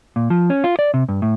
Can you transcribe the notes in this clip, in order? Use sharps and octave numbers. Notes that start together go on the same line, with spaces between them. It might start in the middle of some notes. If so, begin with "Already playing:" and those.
A#2
F3
C#4
F4
D5
C3
G2
A2